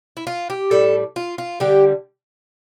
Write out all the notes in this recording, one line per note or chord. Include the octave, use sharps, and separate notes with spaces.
E4
F4
G4
A2 G3 A4
F4
F4
D3 G3 G4